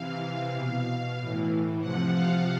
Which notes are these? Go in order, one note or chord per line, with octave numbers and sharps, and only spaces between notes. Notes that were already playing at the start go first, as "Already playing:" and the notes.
Already playing: C3 E3 F5
B2 F5
A2 E3
C3 F3 F#5
F5